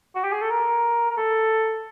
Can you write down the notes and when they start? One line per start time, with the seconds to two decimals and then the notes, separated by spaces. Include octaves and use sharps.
0.15 F#4
0.24 G4
0.32 G#4
0.42 A4
0.50 A#4
1.10 A#4
1.17 A4